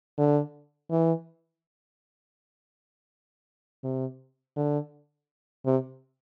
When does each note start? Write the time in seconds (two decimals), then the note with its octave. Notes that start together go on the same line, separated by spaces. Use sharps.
0.18 D3
0.91 E3
3.84 C3
4.56 D3
5.66 C3